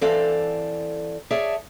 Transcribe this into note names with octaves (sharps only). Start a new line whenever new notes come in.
E3 C4 A4 D5 F5
G#4 C#5 D5 E5 A5